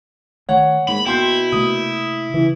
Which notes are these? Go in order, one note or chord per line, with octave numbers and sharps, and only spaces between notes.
D#3 A3 C#5 F#5
G#2 A#3 B5
B2 E4 G5 C6 G6
C3 A3 A#3 D#6
C#3 E3